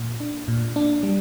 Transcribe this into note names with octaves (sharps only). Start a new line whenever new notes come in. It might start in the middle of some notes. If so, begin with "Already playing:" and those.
Already playing: A#2
D4
A#2
D4
G3